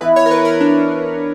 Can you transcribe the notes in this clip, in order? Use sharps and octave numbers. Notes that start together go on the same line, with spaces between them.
E3 B3 E4 B4
C#5
A#4
B4
A#4
D4